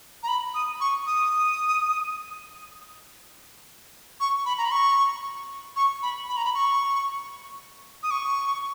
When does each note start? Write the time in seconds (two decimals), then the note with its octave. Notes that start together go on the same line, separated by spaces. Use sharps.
0.23 A#5
0.28 B5
0.54 D#6
0.81 C#6
1.06 D#6
4.20 C#6
4.46 B5
4.58 A#5
4.65 B5
4.71 C#6
5.76 C#6
6.03 B5
6.28 B5
6.37 A#5
6.45 B5
6.55 C#6
8.03 D#6
8.11 C#6